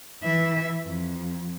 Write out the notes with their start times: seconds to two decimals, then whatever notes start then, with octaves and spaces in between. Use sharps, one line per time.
0.22 E3 E5
0.82 F2